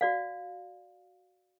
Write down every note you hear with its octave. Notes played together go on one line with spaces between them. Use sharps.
F#4 D5 F5